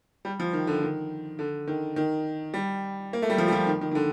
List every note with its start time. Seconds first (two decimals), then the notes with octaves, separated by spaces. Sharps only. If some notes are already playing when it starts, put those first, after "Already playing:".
0.25 G3
0.40 F3
0.53 D#3
0.67 D3
0.83 D#3
1.39 D3
1.67 D#3
1.96 D#3
2.54 G3
3.13 A#3
3.22 A3
3.30 G3
3.38 F3
3.48 G3
3.53 F3
3.67 D#3
3.81 D#3
3.91 D#3
3.95 D3